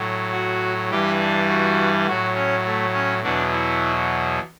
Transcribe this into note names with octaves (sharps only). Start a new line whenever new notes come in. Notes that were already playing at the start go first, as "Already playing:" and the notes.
Already playing: A2 F#3
F#4
G2 E3 G3 G4
D4
F#4
A2 F#3 F#4
C#4
A3
C#4
E2 B2 F#3 D4
E4